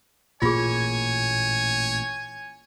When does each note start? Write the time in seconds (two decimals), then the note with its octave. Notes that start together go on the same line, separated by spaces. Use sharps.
0.42 A1 A#2 A#3 F4 G#4 C#5 G#5